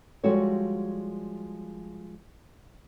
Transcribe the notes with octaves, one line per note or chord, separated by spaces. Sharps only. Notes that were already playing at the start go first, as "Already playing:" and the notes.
F3 G3 G#3 F#4 A4 C#5